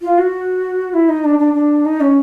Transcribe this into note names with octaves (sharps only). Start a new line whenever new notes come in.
F4
F#4
E4
D#4
D4
D4
D4
D#4
C#4